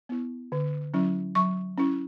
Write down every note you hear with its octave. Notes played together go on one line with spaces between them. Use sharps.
B3 E4
D3
F#3 C#4 E4
F#3 C#6
C#4 E4